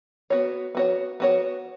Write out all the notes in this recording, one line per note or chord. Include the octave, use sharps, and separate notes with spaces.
B3 F#4 C#5
B3 F#4 C#5
B3 F#4 C#5